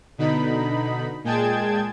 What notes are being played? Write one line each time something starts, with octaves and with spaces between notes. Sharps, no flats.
B2 D3 D#4 B5
A#2 G#3 G#4 G5 A5 G#6